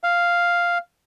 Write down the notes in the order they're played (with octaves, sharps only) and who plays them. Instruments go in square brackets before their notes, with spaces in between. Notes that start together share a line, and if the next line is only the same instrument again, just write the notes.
[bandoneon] F5